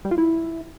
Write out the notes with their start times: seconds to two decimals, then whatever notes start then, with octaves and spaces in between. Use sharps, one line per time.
0.05 G3
0.11 F4
0.18 E4